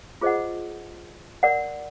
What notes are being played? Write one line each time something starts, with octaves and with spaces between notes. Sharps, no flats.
F4 G#4 C5 D#5 F#5
A#4 D5 F#5